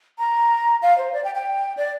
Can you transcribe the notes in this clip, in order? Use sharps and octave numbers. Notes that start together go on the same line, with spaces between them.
A#5
F5
C5
D5
G5
G5
D5